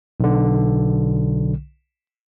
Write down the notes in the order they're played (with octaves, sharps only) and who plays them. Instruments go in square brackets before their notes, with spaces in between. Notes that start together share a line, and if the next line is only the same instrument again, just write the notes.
[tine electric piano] B1 D3